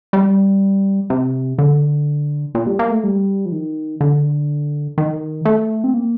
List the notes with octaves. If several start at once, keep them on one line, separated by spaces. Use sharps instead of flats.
G3
C3
D3
A#2
G3
A#3
A3
G3
F3
D#3
D3
D#3
A3
C4
A#3